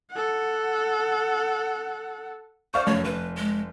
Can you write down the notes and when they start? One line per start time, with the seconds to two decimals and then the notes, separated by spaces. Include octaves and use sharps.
0.12 A4 F#5
2.74 C5 D5 F5 C#6
2.87 F1 F#2 C#5
3.05 F1 B4
3.37 G#3